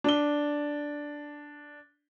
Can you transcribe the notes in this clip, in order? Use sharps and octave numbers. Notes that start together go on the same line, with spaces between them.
D4 G7